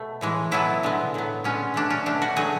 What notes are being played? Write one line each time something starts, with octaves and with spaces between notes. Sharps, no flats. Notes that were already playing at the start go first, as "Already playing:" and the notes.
Already playing: B2 A3
A2 E3 G#3
B2 F#3 B3 E4
D3 G#3 B3
A2 F#3 B3
D3 G#3 B3 C#4
B2 F#3 A3 D4
C#4
B2 A3 D4
F#4
D3 F#3 A3 G#4